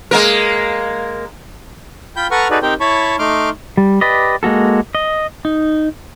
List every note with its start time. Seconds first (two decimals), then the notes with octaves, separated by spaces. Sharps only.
0.11 G#3 A#3 A#4
2.16 F4 G5 B5 G6
2.31 A4 B4 F#5 A#5 C#6 F6
2.51 D#4 F#4 G#4 A4 B4 D5
2.62 C4 D#4 G4 A#4 C5 G5
2.80 E4 C#5 A5 B5 C#6
3.19 A3 D#4 C6 D6 F6
3.77 G3
4.01 G4 B4 D5 D#5
4.43 G#3 A#3 F#4 A4
4.95 D#5
5.45 D#4